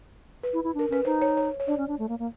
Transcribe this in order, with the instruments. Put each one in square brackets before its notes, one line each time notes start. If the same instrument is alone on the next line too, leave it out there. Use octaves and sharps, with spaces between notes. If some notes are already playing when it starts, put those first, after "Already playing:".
[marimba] B4
[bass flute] E4
E4
[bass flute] D4 [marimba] A#4
[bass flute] C#4 [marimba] B4
[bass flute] D#4 [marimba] C5
[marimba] C#5
C#5
C#5
[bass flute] D4 [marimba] D5
[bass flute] C#4
D4
A3
A#3
A#3